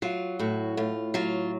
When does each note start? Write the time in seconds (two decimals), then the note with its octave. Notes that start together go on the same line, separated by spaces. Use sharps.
0.02 F#3 F4
0.39 A2 F#4
0.77 A2 F4
1.14 F#3 F4